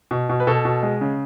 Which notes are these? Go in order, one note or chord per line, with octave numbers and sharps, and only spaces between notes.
B2
B2
B4
B2 A4
B2
G#3
C#3